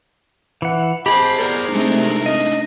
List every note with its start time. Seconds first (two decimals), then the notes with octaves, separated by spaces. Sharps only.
0.62 E3 F#5
1.06 G4 G#4 C5 D#5 A5 B5
1.39 B3 A#4 D5
1.69 C3 G#3 A3 D4 D#4
2.26 D#5